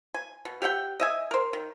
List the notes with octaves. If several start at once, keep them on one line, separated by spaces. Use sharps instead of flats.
G#5
B2
G4 E5 F#5 G5
D#5 E5 G#5
A#4 C5
D#3